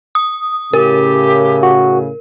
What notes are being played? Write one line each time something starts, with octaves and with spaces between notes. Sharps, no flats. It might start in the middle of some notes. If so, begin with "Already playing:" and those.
D#6
A2 C#3 G4 A#4
F#4